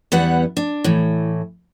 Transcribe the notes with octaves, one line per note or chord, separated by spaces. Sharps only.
E2 G3 B3 B4 F#5
D4
A2 E3